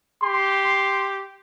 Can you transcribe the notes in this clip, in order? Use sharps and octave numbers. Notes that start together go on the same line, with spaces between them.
G4 C6